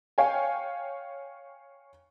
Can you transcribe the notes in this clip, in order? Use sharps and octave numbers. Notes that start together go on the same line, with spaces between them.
C#5 F5 G5 G#5